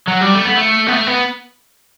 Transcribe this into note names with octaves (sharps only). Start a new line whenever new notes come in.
F#3
G3
A3
B3
A3
B3
A3
B3